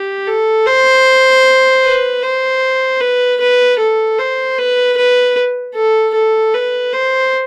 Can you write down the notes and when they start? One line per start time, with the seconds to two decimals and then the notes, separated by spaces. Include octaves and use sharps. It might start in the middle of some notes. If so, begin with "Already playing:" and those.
Already playing: G4
0.27 A4
0.66 C5
1.84 B4
2.22 C5
3.01 B4
3.40 B4
3.80 A4
4.19 C5
4.58 B4
4.97 B4
5.75 A4
6.15 A4
6.54 B4
6.93 C5